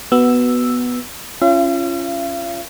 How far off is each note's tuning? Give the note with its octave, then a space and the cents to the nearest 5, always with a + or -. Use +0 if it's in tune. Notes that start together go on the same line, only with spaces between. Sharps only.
B3 +0 F#4 +10 E6 +0
C#4 +0 F4 -25 F5 -45